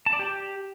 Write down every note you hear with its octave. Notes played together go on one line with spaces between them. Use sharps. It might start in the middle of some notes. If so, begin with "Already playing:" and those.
A5
D5
G4